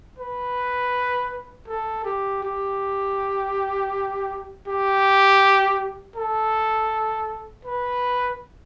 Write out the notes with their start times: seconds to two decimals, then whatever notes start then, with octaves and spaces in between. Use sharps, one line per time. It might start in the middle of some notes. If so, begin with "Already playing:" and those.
0.18 B4
1.68 A4
2.05 G4
2.43 G4
4.67 G4
6.16 A4
7.65 B4